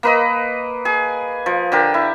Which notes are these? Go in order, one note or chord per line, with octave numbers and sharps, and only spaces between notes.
A#3 B4 D#5
G#4
F3
D3 G4 A#4
E4